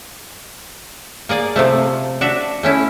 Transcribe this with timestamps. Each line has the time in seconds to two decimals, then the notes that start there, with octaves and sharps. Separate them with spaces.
1.29 A#3 G#4 D5
1.56 C3 F3 A3
2.21 D4 F#4 E5
2.63 A3 C#4 E4